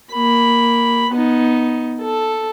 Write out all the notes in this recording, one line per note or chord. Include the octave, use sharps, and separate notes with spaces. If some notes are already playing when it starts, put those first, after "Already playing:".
A#3 B5
B3 D#4
A4